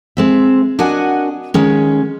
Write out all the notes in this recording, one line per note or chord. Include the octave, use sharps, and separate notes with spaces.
G#3 C4 E5
D4 F#4 A#4 D#5 F#5 G#5
D#3 G#3 C#4